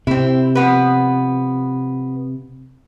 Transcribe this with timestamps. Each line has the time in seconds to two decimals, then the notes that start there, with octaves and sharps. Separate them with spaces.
0.07 C3 C4 E4
0.55 F3 B3 B4